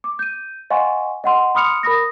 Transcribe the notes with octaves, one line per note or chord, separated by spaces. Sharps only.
D6
G6 D#7
D#5 F5 F#5 G#5 C6 C#6
D#5 F#5 C6
B5 C6 D#6 F6 C#7 F7
A#4 B5 D#6 A#6